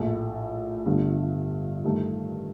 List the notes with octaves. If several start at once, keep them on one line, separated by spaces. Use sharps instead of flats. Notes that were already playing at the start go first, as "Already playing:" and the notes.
Already playing: A#1 A2 A3
G1 G2 D3 A3
G2 D#3 A3